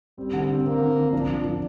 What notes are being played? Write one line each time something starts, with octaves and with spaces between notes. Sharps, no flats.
G3 C4
D3
C4
A#3 C4
D3
D3
F3 D4
F3
F3